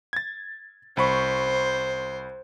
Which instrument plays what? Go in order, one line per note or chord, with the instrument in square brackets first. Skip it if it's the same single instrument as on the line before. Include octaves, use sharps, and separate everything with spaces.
[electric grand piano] G#6 A6
[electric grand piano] C2 B5 C#6 [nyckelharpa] C5